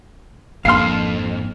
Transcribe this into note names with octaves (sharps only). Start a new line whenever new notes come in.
G#1 F2 A#3 D4 F5 C6 F6 C7